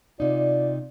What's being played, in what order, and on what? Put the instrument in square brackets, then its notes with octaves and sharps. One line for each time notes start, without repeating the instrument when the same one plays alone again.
[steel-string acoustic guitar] C3 D#4 [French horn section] F4 D5